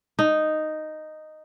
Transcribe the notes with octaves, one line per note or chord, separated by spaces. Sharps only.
D#4